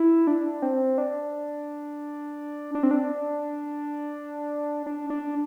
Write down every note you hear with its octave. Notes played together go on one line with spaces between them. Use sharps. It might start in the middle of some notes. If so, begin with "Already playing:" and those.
Already playing: E4
D4
C4
D4
D4
C4
D4
D4
D4